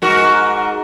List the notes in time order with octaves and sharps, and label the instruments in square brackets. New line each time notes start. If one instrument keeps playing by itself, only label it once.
[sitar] G#2 F#4 A#4